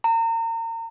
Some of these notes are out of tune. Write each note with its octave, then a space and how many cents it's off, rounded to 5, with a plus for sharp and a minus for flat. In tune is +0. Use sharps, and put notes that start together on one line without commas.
A#5 -35